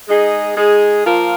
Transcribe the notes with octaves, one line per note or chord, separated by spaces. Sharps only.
G#3 D#4 G#4
G#3 D#4 G#4
F3 A#3 F4 A#4